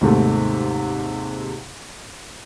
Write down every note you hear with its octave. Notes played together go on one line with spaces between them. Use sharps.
D#2 G#2 C3 A3